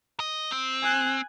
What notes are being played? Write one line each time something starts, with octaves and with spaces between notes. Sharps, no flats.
D#5
C4
G#5 F#6